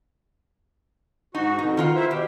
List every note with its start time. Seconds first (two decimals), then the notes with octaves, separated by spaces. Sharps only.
1.35 G#2 D#4 F#4
1.59 F2 B2 D#4
1.77 D#3 F4 F#5
1.96 E4 C5 E5
2.11 B2 G4